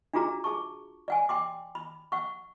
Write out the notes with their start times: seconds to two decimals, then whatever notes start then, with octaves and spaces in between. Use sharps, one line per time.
0.13 D4 F4 F#4 G#4 A#5
0.44 G#4 A5 C#6
1.08 D5 F#5 G#5
1.29 G5 C6 D6
1.75 B5
2.12 F#5 C#6